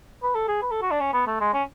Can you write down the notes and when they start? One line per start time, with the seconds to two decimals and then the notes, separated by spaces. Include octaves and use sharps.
0.23 B4
0.35 A4
0.48 G#4
0.62 B4
0.71 A4
0.82 F#4
0.91 D4
1.00 C#4
1.13 B3
1.27 A3
1.40 G#3
1.54 C#4